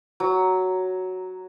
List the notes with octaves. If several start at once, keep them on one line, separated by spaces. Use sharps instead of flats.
F#3